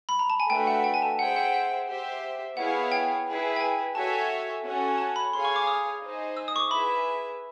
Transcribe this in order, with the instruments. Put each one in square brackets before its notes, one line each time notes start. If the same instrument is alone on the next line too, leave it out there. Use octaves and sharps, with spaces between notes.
[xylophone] B5
A#5
A5
G#5
[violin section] A3 D4 F#4 B4 E5 [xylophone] G5
[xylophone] F#5
G5
G#5
A5
[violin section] G#4 C5 E5 G5 [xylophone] F#5
[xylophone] F#5
F#5
[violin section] G4 C5 E5
[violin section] B3 E4 G#4 C#5 F5 [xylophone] F#5
[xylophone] G5
[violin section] E4 G#4 B4
[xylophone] G5
G#5
[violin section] F#4 A4 C#5 E5 G#5 [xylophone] A5
[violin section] C#4 F#4 A4 C#5 F#5
[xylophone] A5
B5
[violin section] G#4 C#5 F5 G#5 [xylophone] C6
[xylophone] C#6
D6
D#6
[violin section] D#4 G#4 C5 D#5
[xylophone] E6
D#6
C#6
D6
[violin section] E4 G#4 B4 E5 [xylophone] B5